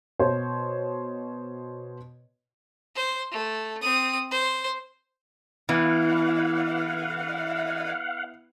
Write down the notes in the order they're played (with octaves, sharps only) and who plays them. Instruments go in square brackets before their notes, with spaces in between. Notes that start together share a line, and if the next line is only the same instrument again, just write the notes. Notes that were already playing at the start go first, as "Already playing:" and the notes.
[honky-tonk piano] B2 C5 C#5
[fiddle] C5
A3
C4 D#6
C5
[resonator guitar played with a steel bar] E3 [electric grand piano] B3 E4 [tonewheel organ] F5 F#5